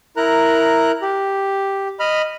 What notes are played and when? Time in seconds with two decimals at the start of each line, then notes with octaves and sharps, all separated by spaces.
0.17 E4 A#4 A#5 F#6
1.02 G4
2.00 D#5 B5 F6